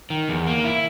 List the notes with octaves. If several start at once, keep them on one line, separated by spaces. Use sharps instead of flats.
D#3
E2
A#3
E4